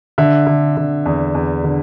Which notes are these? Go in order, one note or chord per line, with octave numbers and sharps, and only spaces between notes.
D3 E5
D3
D3
E2
E2
D3